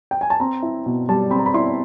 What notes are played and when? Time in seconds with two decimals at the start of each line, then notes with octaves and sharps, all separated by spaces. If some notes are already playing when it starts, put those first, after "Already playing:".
0.11 G5
0.21 G#5
0.30 A5
0.40 C4 A#5
0.62 E4
0.86 B2
1.09 G3 A5
1.31 C4 B5
1.39 A#5
1.46 B5
1.54 E4 C6